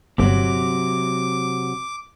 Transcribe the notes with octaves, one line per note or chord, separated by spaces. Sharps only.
G1 C3 F#3 D6